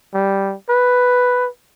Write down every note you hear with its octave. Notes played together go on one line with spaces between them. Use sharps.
G3
B4